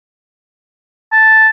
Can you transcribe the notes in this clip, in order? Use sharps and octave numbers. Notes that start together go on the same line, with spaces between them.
A5